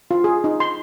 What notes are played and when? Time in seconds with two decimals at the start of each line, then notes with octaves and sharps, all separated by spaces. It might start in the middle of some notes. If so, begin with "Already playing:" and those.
0.11 F4
0.24 G#4
0.44 D#4
0.60 C6